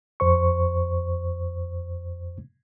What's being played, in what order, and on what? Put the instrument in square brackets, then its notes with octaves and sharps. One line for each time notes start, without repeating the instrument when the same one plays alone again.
[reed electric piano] F2 C5 C#6